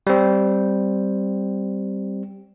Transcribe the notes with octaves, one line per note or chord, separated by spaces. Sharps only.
G3 C4